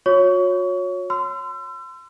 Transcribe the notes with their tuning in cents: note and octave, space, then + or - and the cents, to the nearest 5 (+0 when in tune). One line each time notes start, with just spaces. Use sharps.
F#4 -40 C#5 +0 C#6 +30
C6 -30 E6 +35